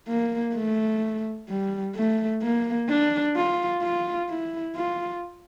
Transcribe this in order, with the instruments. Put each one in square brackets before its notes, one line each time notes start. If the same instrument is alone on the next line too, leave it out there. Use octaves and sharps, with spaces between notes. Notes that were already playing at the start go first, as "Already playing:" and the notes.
[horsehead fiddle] A#3
A3
G3
A3
A#3
D4
F4
F4
E4
F4